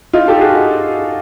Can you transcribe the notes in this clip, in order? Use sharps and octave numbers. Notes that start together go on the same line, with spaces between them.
D#4 F4
G4 A4
F#4 G#4